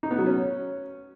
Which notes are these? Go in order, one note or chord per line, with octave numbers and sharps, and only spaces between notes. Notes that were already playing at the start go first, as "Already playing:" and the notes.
D#4
B3
F#3
C#4